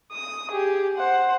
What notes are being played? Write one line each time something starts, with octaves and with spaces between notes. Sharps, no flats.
D#6
G4 G#4
C5 F#5